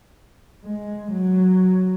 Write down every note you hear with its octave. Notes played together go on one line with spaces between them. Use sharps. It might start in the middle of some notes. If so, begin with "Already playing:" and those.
G#3
F#3